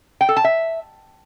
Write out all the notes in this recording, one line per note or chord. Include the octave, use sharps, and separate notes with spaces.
G5
A4
A5
E5